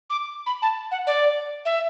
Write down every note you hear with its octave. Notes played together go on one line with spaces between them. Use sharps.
D6
B5
A5
F#5
D5
E5